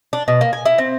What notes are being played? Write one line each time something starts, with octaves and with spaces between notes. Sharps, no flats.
D4
B2
A#3
G#5
E4
C4